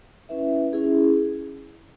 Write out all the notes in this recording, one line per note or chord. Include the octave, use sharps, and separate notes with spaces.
C#4 E4 B4 E5
C#4 E4 G#4